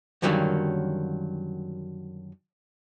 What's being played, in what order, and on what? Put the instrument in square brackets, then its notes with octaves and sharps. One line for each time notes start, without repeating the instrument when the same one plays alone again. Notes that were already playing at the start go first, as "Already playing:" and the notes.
[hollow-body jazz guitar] F#2 D3 D#3 F#3 G3 A#3